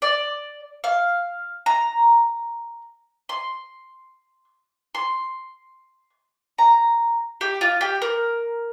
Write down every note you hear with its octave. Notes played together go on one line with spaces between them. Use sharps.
D5
F5
A#5
C6
C6
A#5
G4
F4
G4
A#4